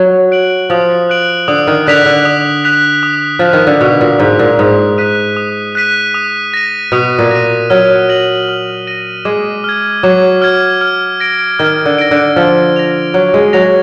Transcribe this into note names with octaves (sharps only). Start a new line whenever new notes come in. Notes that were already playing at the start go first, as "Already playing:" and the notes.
Already playing: F#3
F#6 D7 F#7
F3 D#6
F#6 D7 F#7
D3 D#6
D#3
D3 F#6 B6 F7
D3
D#6
F#6 B6 F7
D#6
F3 F#6 B6
D#3
D3
B2 D#6
A#2
G#2 F#6 B6
A#2
G#2 D#6
F#6 B6 D#7
D#6
F#6 B6 D#7
D#6
A#6 D#7
B2 D#6
A#2
A#6 D#7
F#3 F6
A#6 D#7 F#7
F6
A#6 D#7 F#7
G#3 D6
F6 G#6
F#3 D6
F6 G#6
F6
A#6 D7
D#3 F6
D3
A#6 D7
D3
F3 F6
A#6 F7
F#3 F6
G#3
F#3 A#6 F7